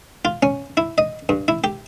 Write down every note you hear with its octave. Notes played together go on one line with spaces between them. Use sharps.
F4
C#4
E4
D#5
G2
E4
G4